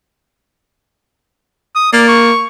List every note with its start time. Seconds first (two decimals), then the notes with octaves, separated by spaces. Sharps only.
1.75 D#6
1.93 A#3 D5
2.08 C#6